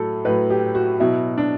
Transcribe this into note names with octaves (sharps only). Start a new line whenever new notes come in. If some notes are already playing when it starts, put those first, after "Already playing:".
Already playing: A2 F#3 A4
A2 F#3 B4
G4
F#4
B2 F#3 E4
D4